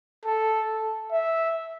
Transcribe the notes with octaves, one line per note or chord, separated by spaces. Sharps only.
A4
E5